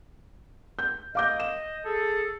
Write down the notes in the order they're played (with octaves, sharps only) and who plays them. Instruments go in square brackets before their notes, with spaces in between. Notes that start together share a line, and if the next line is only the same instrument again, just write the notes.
[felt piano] G6
[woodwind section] D#5 [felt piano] F5 D6 G6
[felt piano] E7
[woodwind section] G#4 A4